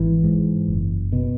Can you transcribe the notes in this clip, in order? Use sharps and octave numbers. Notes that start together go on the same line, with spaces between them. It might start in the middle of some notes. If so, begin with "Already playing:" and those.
Already playing: G#1 E3
G#2
F#1
B2